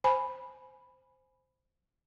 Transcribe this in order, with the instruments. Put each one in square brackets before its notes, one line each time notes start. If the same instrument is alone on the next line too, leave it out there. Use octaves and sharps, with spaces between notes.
[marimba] C5 G#5 B5